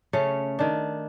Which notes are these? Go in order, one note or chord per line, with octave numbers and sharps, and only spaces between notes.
C#3 A3 C#4
D#3 D4